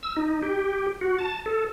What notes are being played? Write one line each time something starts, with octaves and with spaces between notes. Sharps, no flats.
E6
D#4
G4
F#4
A5
A4